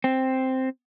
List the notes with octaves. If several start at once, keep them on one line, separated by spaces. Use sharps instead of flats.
C4